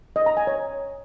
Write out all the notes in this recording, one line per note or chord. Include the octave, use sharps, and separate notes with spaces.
D#5
A#5
G#5
C#5